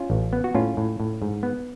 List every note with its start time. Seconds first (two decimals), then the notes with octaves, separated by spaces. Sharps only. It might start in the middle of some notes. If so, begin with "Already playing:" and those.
Already playing: C#4 F4
0.10 A1
0.33 B3
0.44 F#4
0.54 A2 C#4 F4
0.77 A2
1.00 A2
1.22 G#2
1.43 B3